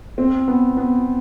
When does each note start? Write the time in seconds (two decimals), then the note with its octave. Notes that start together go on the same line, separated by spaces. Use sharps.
0.18 C4
0.48 B3
0.77 B3